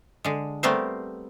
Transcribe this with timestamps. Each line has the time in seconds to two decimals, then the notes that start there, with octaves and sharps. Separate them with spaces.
0.25 D3 G#3
0.63 G3 A3 B3 C4 A#4 C5